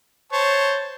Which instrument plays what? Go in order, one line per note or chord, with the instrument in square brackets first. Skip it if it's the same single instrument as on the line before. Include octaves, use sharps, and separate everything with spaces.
[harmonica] C5 C#5 A5